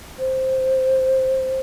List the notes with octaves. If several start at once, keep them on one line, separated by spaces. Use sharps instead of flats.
C5